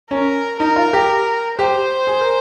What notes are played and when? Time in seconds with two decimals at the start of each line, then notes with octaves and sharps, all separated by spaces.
0.11 C#4 A#4
0.60 D#4 A#4
0.76 F4
0.93 G4
1.58 G4 C5
2.07 G#4
2.21 A#4